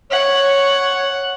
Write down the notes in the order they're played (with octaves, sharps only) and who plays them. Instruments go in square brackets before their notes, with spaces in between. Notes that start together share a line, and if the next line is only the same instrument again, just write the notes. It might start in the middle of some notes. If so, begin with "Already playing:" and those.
[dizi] C#5 [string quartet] F#5